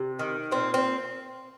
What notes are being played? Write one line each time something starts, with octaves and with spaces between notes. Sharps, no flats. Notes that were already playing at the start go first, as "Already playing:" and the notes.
Already playing: C3
D#3
A#2 C4
C4